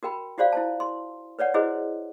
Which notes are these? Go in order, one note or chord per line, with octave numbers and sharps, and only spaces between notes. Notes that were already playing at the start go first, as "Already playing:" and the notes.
F#4 A#4 G5 B5
F4 F#4 C5 D5 F5
E4 C5 A5
C6
B4 C#5 D5 F#5
E4 F#4 G#4 B4 C5 D#5